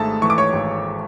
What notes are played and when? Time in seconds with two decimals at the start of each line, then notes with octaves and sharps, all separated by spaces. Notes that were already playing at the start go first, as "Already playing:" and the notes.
Already playing: G#1 G#2 A3 G#4 A4 A5
0.22 E3 C#6
0.30 D6
0.38 C#5 C#6
0.53 G#1